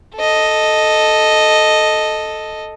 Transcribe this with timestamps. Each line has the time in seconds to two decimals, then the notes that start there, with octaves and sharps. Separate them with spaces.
0.16 A4 D#5